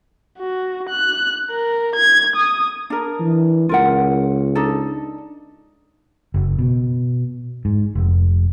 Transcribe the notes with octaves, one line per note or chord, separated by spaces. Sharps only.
F#4
F#6
A#4
G#6
D#6
D4 A#4
E3
C#2 F4 A#4 F#5
D4 D#4 A4
F#1
B2
G#2
F1